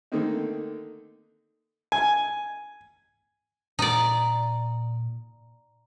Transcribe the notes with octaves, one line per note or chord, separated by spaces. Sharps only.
D3 D#3 A3 A#3 C4 D#4
G#5
A#2 D#4 D5